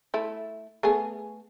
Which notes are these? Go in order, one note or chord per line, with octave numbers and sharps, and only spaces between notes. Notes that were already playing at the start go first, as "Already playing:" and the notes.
A3 E4
A3 B3 G#4